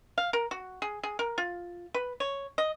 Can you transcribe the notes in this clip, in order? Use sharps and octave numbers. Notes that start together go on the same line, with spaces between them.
F5
A#4
F#4
G#4
G#4
A#4
F4
B4
C#5
D#5